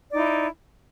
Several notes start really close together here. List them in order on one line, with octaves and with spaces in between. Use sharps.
D5 D#4 E4